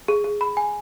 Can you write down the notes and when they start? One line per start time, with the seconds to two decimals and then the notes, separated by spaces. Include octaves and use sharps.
0.08 G#4
0.24 G#4
0.41 B5
0.57 G#5